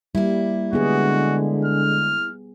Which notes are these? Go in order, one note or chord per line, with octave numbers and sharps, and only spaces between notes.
G3 A#3 E4
D3 G#3 B3 F#4 G#4
F6